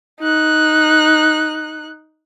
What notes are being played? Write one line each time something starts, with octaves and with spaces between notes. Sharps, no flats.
D#4 F#6